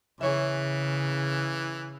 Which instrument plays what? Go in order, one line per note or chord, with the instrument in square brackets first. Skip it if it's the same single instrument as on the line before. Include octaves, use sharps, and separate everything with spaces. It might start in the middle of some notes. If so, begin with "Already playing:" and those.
[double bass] C#3 [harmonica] E3 [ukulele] G#4 C#5 E5